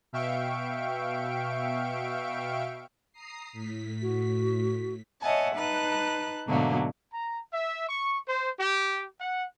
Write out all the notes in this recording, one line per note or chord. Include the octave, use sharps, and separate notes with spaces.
B2 E5 F5 G5 C#6 D7
A#5 D#6 C7
A2 B6
F#4
C#5 D#5 E5 F#5 G#5 A5
D#4 B4 A5 F#6
G#2 B2 D3 F#3 A3 A#3
A#5
E5
C#6
C5
G4
F#5